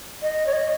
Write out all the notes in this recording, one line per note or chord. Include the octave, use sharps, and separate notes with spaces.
D#5
C#5
D#5